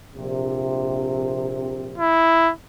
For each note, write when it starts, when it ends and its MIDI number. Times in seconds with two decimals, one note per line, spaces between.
0.16 2.08 34
0.16 2.08 48
1.98 2.53 64